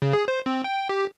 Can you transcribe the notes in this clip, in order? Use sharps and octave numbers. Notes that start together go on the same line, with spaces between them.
C#3
G#4
C5
C4
G5
G4